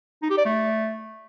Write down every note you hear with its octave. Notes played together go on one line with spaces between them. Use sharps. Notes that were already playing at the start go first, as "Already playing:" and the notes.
D#4
G4
D5
A3